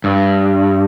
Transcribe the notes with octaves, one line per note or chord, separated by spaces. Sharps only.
G2